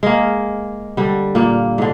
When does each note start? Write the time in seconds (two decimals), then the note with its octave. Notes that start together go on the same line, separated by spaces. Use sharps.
0.03 G#3 A#3
0.97 D3 G3
1.35 A#2 A#3
1.78 G#2 D3